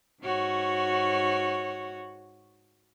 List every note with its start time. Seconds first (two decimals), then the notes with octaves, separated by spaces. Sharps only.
0.23 G#2 F#4 C#5